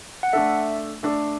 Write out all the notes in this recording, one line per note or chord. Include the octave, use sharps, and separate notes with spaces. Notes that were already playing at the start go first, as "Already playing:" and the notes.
F#5
A3 D4 A4 E5
A3 D4 A4